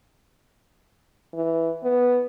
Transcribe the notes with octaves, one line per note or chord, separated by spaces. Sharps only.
E3
B3